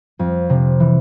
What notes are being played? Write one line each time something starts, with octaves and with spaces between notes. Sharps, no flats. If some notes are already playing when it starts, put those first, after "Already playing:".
F2
C3
E3